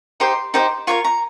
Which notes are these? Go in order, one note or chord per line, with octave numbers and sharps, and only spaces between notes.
D#4 G4 C5 C6
D#4 G4 C5 D#5
F4 A#4 C#5 C#6
A#5